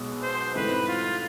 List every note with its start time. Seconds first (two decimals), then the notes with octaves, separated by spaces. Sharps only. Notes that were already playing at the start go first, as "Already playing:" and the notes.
Already playing: B1 B2 G#3 B3
0.23 C5
0.55 G#2 E3 A3 C4 B4
0.88 F4